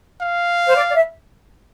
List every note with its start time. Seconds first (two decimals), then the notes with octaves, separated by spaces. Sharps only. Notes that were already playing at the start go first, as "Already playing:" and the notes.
0.21 F5
0.67 C5
0.75 D5
0.90 D5
0.94 E5